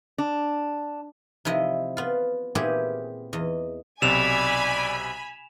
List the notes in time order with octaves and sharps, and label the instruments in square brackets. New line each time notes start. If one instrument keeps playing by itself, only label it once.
[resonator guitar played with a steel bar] D4
[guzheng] C3 F3 E4 D#5
B3 F4
A#2 B3 C4 E4 G4 G#4
E2 D#5
[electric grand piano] B1 C3 [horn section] D5 [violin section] G#5 B5 [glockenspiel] E7 F7